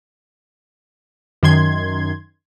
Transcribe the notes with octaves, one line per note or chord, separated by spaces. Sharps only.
F#2 D#3 C6 G#6